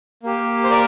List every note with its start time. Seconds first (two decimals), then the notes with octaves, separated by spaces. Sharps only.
0.23 A#3 G4
0.64 C5
0.71 A#4 D5